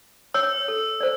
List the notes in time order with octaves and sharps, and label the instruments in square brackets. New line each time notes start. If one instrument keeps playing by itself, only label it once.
[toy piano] C#5 [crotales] E6
[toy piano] A4
C5 D5